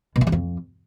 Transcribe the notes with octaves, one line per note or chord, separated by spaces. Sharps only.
B2
E3
E2
F2